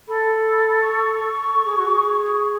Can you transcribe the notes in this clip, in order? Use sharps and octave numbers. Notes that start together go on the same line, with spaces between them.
A4 B5
C#6
A4
G#4
F#4
G#4
C#6